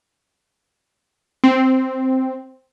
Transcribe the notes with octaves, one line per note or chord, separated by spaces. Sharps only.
C4